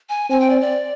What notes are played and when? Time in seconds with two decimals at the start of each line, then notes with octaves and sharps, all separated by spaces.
0.09 G#5
0.30 C4 G#5
0.40 G5
0.50 D5
0.61 D5